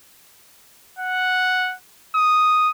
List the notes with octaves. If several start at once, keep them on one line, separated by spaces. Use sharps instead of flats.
F#5
D#6